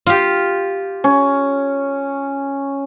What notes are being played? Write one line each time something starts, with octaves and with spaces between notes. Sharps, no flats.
F4 G4
C#4